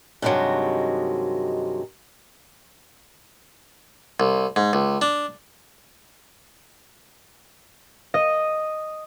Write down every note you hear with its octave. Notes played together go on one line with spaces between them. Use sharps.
G2 C3 D#3 E3 F#3 G#3
C2
G#2
C#2
D4
D#5